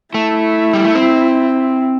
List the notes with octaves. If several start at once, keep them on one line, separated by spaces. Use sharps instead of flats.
A3 E4
G3
A3
C4